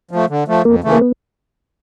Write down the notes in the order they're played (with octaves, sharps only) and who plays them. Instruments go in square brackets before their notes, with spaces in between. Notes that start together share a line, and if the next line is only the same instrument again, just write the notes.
[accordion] F3 A3
D3
F3 A3
[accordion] F2 [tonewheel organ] A#3
[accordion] C#3 E3 A3
[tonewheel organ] A#3
B3